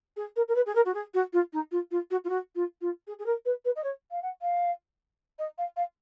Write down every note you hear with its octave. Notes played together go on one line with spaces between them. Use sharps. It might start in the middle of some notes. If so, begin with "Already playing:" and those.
G#4
A#4
A#4
B4
G#4
A#4
F#4
G#4
F#4
F4
D#4
F4
F4
F#4
F4
F#4
F4
F4
G#4
G#4
A#4
B4
B4
D#5
C#5
F5
F#5
F5
D#5
F5
F5